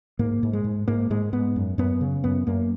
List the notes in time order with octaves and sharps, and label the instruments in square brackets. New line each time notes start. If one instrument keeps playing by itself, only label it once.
[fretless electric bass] G#2 A#3
G#2
G#3
G#2
G#2 A#3
G#2 G#3
G#2 B3
F#2
F#2 B3
C#3
F#2 B3
F#2 A#3